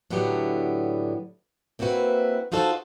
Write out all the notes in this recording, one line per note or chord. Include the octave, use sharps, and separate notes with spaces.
A2 D3 F#3 B3 G4
A#3 C4 E4 F#4 B4
D#4 F4 F#4 A4 C5 A5